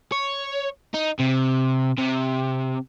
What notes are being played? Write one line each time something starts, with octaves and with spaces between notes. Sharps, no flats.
C#5
D#4
C3
C3